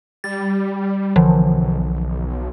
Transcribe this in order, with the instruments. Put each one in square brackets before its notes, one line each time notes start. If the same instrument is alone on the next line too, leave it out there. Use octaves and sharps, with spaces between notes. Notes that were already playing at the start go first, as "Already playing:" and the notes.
[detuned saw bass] G3 [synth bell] A6
[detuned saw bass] B1 [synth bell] D3 E3 F3